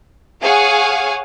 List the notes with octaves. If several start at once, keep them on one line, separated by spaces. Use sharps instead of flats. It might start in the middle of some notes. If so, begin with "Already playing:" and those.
G#4 C#5 F5 F#5 G#5